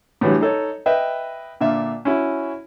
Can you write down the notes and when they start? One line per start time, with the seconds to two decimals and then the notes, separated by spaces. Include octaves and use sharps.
0.21 A2 D3 E3 F#3 G3
0.41 D#4 A4 C#5
0.86 B4 D#5 E5 G5
1.61 A#2 D3 E5 F5
2.05 C#4 E4 F#4